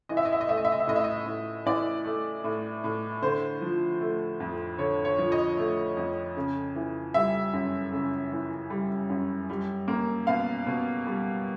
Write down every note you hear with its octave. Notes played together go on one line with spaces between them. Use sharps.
E3 D#5
E5
D#5
E5
D#5
A3 E5
D#5
E5
D#5
E5
A2 D#5
E5
D#5
A2
E3 D5
A3
A2
A2
D3 C5
F3
A3
F2
D3 C#5
C#5
F3
D#5
A3
F2
C#3
E3
G3 E5
F#2
C#3
E3
G3
F#2
G3
A#3
B2 F5
B2
G3